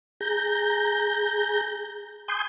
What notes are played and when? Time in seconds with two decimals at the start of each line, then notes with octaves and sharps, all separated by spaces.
0.20 G#4 A#5 G6
2.28 G#5 C6 D#6 G6